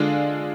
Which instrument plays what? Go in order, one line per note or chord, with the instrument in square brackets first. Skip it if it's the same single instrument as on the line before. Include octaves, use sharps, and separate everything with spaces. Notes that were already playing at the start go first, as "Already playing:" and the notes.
Already playing: [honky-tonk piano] D3 G#3 D4 F4